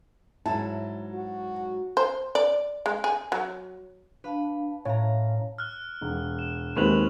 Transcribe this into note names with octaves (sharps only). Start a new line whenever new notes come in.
G#2 F#3 E4 A5
F#4
C5
D5
G#3
G#4
F#3
D4 B4 F5 A5
A2 C#4 F5 A5 A#5
F6 F#6
E1
E7
D#2 G#3 C4 B4 C#6 F7 F#7